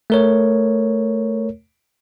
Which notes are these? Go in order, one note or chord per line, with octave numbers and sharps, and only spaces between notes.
A3 A#4 C#5